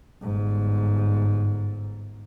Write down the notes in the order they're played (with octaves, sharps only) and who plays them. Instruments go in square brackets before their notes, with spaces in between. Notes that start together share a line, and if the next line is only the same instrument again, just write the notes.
[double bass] G1 G#2